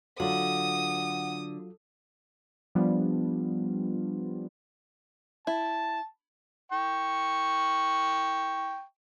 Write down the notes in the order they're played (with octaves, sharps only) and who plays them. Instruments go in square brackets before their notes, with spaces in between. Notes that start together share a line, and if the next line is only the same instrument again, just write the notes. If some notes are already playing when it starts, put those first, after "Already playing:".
[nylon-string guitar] D3 [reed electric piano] F#3 F4 F#4 [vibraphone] F#5 [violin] D#6
[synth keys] F3 G3 B3 D4 F4
[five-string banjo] E4 [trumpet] A5
[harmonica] G5 C#6